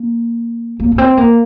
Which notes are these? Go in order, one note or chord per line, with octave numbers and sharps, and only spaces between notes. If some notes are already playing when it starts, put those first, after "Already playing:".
Already playing: A#3
A#3
A#3
C4
A#3